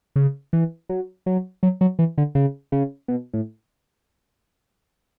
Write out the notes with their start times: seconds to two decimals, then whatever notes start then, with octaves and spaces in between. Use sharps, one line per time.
0.16 C#3
0.53 E3
0.89 F#3
1.26 F#3
1.63 F#3
1.81 F#3
1.99 E3
2.18 D3
2.35 C#3
2.72 C#3
3.08 B2
3.34 A2